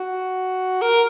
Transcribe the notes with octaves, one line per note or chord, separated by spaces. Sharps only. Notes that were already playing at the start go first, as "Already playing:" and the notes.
Already playing: F#4
A#4